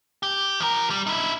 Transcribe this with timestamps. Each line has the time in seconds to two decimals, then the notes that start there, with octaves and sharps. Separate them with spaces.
0.23 G4
0.60 F3 A#4
0.90 G3
1.07 D#4 E4